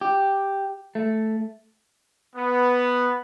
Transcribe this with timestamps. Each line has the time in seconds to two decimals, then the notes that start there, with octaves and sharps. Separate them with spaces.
0.01 G4
0.95 A3
2.36 B3